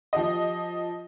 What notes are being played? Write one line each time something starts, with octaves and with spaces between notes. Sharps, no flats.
F3 G4 D#5